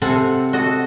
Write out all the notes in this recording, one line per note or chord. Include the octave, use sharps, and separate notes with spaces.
C3 C4 A4 F5 F#5 G#5
F#4 A4 D#5